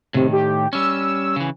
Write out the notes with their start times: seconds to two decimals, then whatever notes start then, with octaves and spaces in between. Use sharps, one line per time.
0.14 A2 C3 D#3
0.32 G4
0.73 G3 C#4 E6
1.36 C#3 E3